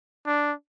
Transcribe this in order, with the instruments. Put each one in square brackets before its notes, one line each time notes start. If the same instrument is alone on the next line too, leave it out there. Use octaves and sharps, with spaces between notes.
[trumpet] D4